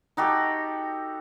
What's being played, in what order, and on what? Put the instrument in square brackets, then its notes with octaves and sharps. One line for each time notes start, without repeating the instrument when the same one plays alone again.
[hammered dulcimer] D#4 F#4 G4 A4